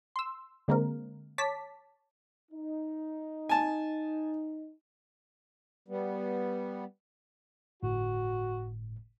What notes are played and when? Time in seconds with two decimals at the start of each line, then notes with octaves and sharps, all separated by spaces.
0.16 C6 E6
0.68 D3 G#3 A#3 C4 A#4
1.38 C#5 A5 D6 B6
2.52 D#4
3.49 G#5 A5
5.88 G3 B3
7.83 G1 A2 F#4